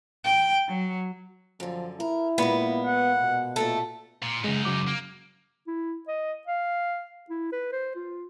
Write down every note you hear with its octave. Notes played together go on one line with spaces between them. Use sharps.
G5
F#3
F#2 D3 F3
E4 A#4
A#2 G#3 A#3 B3
F#5
B2
A#2 A3 A4 A5
A#2
F#2 C#3 G#3 D#4
C#3 F#3 D6
A#3
E4
D#5
F5
E4
B4
C5
F4